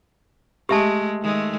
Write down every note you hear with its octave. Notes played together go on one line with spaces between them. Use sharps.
G#3 A3 G4 E5 A5
D#3 G#3 A3